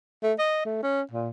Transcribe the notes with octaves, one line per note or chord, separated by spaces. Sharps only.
A3
D#5
A3
C#4
A#2